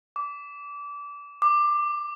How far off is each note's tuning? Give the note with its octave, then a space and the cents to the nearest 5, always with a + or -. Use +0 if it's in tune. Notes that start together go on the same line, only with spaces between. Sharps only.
D6 -25
D6 +15